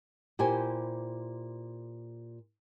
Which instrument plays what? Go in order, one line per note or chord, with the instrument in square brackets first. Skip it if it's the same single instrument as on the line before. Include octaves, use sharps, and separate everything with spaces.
[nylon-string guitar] A#2 E4 G4 C5 G#5